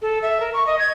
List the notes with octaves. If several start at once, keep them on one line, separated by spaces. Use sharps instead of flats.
A4
E5
A#4
C#6
D#5
G#6